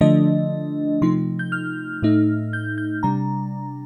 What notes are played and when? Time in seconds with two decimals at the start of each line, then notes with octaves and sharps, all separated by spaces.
0.01 D3 F3 A3 D4 D#5
1.02 C3 F3 A3 D#4 C6
1.39 G6
1.52 F6
2.02 A2 A3 D#4
2.53 G6
2.78 G6
3.03 C3 G3 D4 A#5